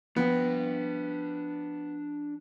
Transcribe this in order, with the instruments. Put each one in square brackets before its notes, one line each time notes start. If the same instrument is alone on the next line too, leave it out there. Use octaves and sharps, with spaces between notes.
[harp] F3 D7 [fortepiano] B3 [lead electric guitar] D4 G5